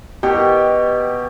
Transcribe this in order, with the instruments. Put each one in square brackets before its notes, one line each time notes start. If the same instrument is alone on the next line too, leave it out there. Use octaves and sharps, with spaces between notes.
[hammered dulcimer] B2 [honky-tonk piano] G4